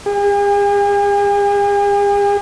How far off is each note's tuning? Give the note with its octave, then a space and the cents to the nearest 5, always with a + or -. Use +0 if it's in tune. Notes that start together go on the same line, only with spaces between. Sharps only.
G#4 -45